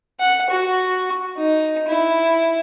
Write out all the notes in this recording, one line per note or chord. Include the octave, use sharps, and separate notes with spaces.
F#5
F#4
D#4
E4